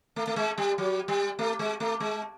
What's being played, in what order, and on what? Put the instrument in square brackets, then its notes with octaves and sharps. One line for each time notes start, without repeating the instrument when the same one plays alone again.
[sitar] A3
A3
G#3
G3
F#3
G3
A3
G#3
A3
G#3